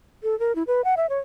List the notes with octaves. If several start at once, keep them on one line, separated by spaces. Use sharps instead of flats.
A4
A#4
E4
B4
F#5
E5
C#5